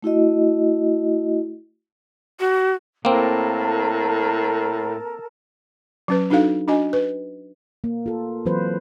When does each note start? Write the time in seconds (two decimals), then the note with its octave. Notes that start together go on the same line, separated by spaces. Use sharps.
0.03 A3 E4 F#4 D#5
2.40 F#4
3.05 A2 A#3 C4 A4 A#4 A5
6.08 F#3 C#4 B4
6.30 D4 D#4 F#4 A4 F5
6.68 D4 F#4 D#5 G#5
6.93 B4
7.84 A#3
8.06 F4 A4
8.46 E3 F#3 C4 F4 B4 C5